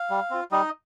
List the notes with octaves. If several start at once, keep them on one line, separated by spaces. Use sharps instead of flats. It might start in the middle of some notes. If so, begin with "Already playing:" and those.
Already playing: F5
G3
C4 F4
G3 D#4 D#5